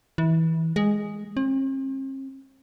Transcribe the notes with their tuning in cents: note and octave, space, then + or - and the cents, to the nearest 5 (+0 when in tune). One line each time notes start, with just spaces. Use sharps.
E3 -25
G#3 -5
C4 +45